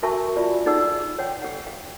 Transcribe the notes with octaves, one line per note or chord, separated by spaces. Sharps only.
F#4 A#4 E5 G#5 A5 C#6
F4 D5
D#4 G#4 D5 F#5 E6
C#5 F#5 G5
G4 F#5
F5